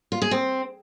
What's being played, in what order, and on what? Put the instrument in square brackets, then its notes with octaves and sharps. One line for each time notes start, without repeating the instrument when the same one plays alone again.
[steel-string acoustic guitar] F4
G#4
C4